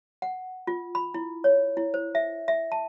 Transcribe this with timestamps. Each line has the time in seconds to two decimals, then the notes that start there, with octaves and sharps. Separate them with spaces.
0.22 F#5
0.67 F4
0.95 B5
1.14 E4
1.44 C#5
1.77 E4
1.94 C5
2.15 E5
2.48 E5
2.72 A5